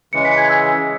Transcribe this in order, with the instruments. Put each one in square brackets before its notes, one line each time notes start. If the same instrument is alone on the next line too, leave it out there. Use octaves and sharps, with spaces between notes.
[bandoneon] C#3 E3 G#3 [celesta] C#7
[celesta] B6
G#6
E6